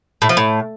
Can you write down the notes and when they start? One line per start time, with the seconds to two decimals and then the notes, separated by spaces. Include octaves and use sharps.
0.22 A2
0.29 F3
0.37 A2